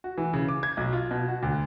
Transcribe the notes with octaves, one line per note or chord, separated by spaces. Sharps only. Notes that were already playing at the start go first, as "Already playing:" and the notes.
F#4
E3
C#3
D6
G#6
B1
F4
B2
F#4
D2